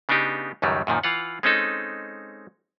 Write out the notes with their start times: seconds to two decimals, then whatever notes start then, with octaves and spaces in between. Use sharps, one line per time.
0.09 C#3 B3 D4 D#4 G4
0.62 C#2 F#2 D#3 F#3 G3
0.87 F#2 A#2 D#3 F3
1.03 E3 F4 F5 F#5
1.43 G#3 C4 C#4 D#4 A4